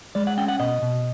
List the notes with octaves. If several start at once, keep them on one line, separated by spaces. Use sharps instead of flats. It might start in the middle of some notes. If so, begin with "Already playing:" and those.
G#3 D5
F#5
C#4 G5
F#5
B2 D#5
B2